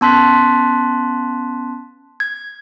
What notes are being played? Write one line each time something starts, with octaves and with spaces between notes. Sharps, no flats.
B3 C#4 A5 C6 F#6 B6
G#6